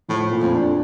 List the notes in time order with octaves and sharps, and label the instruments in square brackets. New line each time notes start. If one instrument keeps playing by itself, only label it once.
[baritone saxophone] A2 [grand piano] F3
[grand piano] A#2
[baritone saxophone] F2
[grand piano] D4